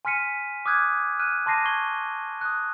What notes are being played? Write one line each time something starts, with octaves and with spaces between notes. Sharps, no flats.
G#5 C6 F6 B6 C#7 D#7
D6 D#6 F6 F#6 G#6
F6 F#6 D#7
A5 C6 D6 A#6 C7 D#7
C#6 G#6 C7 G7
D#6 F#6